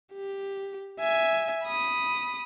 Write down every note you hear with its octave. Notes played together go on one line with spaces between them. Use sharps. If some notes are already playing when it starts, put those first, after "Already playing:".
G4
E5 G#5
B5 D#6